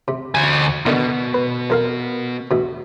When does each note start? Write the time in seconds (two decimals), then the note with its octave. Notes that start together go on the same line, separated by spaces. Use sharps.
0.08 C3
0.35 D2 G#5
0.86 B2 D3 D#3 D#4
1.34 B4
1.70 F2 A#4 F5
2.51 D2 B2